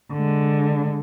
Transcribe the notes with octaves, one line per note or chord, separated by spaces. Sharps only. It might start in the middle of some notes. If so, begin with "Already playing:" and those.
D3 G#3